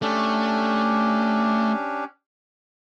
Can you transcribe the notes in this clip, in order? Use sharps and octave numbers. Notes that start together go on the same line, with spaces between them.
A3 C#4 D4 G4